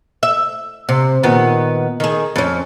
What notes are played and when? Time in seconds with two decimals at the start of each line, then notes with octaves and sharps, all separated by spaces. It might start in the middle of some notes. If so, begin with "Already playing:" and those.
0.23 E5
0.89 C3
1.23 A#2 D#3 B3
2.00 D#3 G#4
2.36 F2 C#4